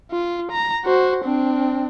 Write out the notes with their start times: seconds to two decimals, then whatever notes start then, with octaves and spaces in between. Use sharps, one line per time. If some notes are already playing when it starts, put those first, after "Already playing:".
0.11 F4
0.52 A#5
0.85 F#4 C5
1.25 C4 D4